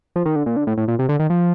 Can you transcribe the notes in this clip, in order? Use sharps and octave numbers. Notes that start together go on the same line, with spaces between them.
F3
D#3
D3
A#2
D3
A2
A2
A#2
C3
D3
D#3
F3